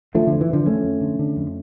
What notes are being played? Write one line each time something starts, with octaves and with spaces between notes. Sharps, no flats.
D3 F3 A3
D3
F2
E3
F2 D3 F3
F2 A3 C#4
F2
D3
D3
F2